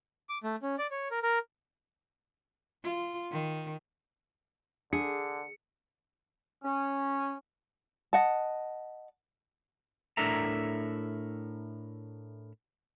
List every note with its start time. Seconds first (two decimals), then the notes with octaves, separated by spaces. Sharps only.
0.29 D6
0.44 A3
0.62 C#4
0.78 D5
0.91 C#5
1.11 A#4
1.23 A#4
2.84 F4
3.31 D#3
4.93 D3 D4 G#4 C#7
6.64 C#4
8.13 D#5 F#5 A5
10.17 A2 D4 A4 A#4 E5 A#5